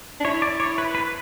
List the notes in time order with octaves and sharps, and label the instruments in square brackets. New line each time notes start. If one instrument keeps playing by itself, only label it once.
[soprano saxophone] D4
[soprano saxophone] E4 [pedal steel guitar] C#5
[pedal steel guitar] D5
C#5
B4
B4